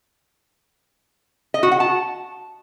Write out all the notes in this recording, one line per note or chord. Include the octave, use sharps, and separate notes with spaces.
D#5
F#4
F#5
A5